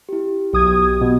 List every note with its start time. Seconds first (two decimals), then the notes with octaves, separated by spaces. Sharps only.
0.09 E4 G4
0.53 B1 G4 D#6 G#6
1.01 B2